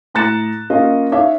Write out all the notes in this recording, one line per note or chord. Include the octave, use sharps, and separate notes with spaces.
A2 A#5 F#6 A6 C#7 E7
A#3 C#4 F4 D#5
D#4 C#5 E5 F5